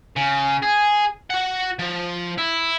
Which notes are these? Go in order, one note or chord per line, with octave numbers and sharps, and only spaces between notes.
C#3
G#4
F#4 F#5
F3
E4